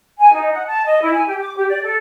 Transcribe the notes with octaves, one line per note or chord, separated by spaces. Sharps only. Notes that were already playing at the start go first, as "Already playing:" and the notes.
G#5
D#4
F#5
A5
D#5
E4
G#5
G4
D6
G4
D5
A4